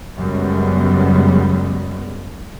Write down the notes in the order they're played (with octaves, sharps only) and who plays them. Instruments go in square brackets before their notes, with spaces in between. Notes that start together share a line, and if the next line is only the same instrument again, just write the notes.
[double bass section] F#2 C#3 G3 G#3 B3